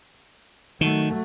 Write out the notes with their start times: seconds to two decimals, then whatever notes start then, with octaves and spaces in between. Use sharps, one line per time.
0.81 D#3 F#3 A3